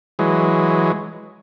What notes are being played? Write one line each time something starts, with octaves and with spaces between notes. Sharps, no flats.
E3 F#3 G#3